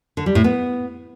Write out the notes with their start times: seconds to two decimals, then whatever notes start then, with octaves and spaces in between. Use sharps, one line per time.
0.17 D3
0.26 G3
0.35 A2
0.44 B3